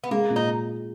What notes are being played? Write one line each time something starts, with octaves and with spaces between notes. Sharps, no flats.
B3
G#3 A#3
A#2
D#4